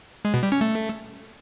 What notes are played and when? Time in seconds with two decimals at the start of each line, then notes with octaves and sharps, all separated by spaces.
0.25 G#3
0.34 B2
0.43 G3
0.52 C#4
0.61 A3